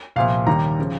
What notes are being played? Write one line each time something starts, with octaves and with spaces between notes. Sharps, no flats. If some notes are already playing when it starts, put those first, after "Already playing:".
C2 A#2 F3 F5
D#2 D#3 G3 A#5
C#3 F3